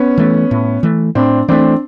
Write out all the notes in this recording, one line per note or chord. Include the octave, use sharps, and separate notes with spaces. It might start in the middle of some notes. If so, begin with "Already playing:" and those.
Already playing: B3 C#4
E3 A3
A2
E3 A3
A2 C4 D4
E3 A3 C4 D4